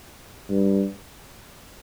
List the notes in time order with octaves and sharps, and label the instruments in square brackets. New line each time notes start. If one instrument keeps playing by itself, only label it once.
[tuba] G2